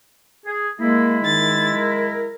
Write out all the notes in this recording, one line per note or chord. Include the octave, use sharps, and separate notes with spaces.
G#4
G#3 A#3 E4
D#3 A6
A#4